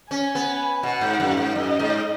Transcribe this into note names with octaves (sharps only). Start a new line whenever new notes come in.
C#4 G#5
B3
B2 F#5
G#2
F#2
G#2
F#2 D#5
G#2